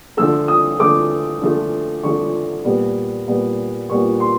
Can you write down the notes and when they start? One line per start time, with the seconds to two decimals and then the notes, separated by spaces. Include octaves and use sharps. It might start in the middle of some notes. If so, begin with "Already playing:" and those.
0.17 D3 F3 A3 E6
0.48 D#6
0.80 D3 F3 A3 D6
1.42 D3 F3 A3
2.03 D3 F3 A3 C#6
2.65 A#2 G3 B3
3.27 A#2 G3 B3
3.89 A#2 G3 B3 C#6
4.20 C6